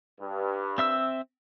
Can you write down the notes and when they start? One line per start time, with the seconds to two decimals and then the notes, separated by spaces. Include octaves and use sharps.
0.20 G2
0.78 C4 E5 E6